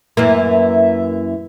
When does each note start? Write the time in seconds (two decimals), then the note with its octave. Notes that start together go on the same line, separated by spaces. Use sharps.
0.17 F#2 E3 A#3 E5